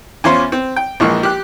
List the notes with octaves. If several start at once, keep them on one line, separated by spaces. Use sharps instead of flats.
E2 C#4 F4 C5 C6
C4
G5
A#1 E3 F3 G#3 A#3 C#6
G4 F#6